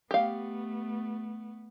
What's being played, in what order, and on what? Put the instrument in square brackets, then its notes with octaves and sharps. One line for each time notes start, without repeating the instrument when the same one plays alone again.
[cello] A3 B3 [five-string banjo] G4 F5